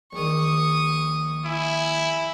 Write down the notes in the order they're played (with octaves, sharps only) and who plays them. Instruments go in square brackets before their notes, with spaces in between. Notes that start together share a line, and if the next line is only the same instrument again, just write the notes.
[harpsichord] A#1 D#3 [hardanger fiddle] C#6 D#6
[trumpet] E4 [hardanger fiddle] G#5